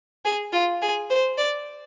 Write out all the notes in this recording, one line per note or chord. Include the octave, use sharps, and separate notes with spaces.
G#4
F4
G#4
C5
D5